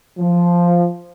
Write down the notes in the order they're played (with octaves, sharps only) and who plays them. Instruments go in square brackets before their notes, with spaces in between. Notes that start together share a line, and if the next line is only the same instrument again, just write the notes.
[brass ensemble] F3